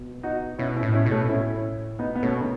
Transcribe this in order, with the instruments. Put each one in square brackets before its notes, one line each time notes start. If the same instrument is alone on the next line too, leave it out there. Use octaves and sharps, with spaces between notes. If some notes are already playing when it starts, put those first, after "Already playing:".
Already playing: [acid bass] B2
[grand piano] D#4 F#4
[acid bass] B2 [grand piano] C#4 E4
[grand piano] C#4 E4
[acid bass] A2
[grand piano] C#4 E4
[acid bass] B2
[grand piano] A3 C#4
[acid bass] A2 [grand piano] C#4 E4
[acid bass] B2 [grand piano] B3 D#4
[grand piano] B3
[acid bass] B2 [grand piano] A3 C#4
[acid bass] D#3